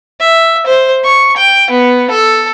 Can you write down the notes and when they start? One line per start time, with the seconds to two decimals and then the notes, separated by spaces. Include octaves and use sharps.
0.20 E5
0.66 C5
1.04 C#6
1.36 G5
1.70 B3
2.11 A4